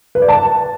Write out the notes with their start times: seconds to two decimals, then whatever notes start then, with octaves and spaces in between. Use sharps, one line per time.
0.15 B4
0.22 D5
0.28 A5